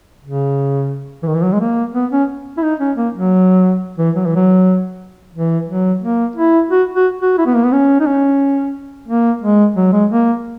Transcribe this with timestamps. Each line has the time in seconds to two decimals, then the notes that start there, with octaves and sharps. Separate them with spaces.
0.25 C#3
1.23 E3
1.27 D#3
1.35 E3
1.43 F#3
1.53 G#3
1.60 A#3
1.95 B3
2.12 C#4
2.57 E4
2.63 D#4
2.80 C#4
2.97 A#3
3.14 F#3
3.98 E3
4.16 F#3
4.26 E3
4.35 F#3
5.35 E3
5.69 F#3
6.02 A#3
6.36 E4
6.71 F#4
6.95 F#4
7.21 F#4
7.38 E4
7.46 B3
7.55 A#3
7.64 B3
7.73 C#4
8.00 D#4
8.06 C#4
9.08 A#3
9.41 G#3
9.76 F#3
9.93 G#3
10.10 A#3